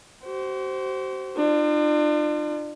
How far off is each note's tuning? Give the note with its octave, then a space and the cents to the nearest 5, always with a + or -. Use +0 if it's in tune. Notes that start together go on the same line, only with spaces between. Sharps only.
F#4 +45 C5 +0
D4 +35 F4 -20